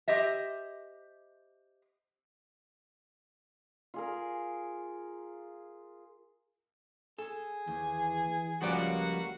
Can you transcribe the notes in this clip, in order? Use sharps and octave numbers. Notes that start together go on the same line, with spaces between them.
G4 C5 D#5 E5
F4 G#4 A#4
G#4 A4
D#2 E3
C#2 F3 G3 A#3 F#4 D5 F#5